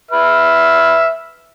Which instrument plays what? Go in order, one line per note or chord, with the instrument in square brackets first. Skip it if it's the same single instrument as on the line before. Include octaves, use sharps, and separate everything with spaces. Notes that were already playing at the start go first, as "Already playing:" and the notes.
[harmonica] B4 E5 F6